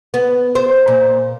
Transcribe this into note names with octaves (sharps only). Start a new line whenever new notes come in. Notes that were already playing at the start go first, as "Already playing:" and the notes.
B3
C5
A#2